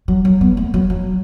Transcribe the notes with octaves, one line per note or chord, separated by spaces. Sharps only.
F#3
F#3
B3
A3
F#3
F#3